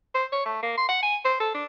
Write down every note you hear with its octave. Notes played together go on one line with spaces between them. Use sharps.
C5
C#5
A3
A#3
C6
F#5
G#5
C5
A4
D4